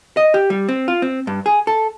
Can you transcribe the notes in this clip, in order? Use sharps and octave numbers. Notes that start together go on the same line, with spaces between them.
D#5
G4
G3
C4
F4
C4
G2
G#4
A4